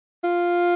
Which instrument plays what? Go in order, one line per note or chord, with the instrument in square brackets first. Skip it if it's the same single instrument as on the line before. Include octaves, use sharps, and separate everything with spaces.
[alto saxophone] F4